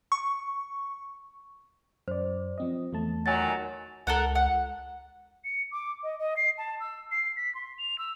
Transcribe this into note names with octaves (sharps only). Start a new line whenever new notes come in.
C#6
F#2 C5 D5
F3 C4 D#5
E2 A3 A5
A#2 D#3 F#3 G#5 A6
C#2 A4 A#4 F#5
F#5
C#7
D6
D#5
D#5
C7
A5
E6
C7
B6
C6
F7
E6